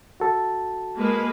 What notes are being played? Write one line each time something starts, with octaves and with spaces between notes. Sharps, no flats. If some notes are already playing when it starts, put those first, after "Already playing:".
F#4 A4 A5
G#3 A#3 B4